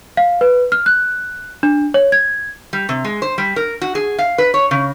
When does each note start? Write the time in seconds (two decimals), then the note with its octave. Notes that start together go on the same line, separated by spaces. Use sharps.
0.17 F5
0.41 B4
0.72 F6
0.86 F#6
1.63 D4
1.94 C#5
2.12 G#6
2.73 G3
2.89 C3
3.05 G#3
3.22 C5
3.38 G3
3.56 A#4
3.82 F#4
3.95 G#4
4.19 F5
4.38 B4
4.54 C#5
4.71 C#3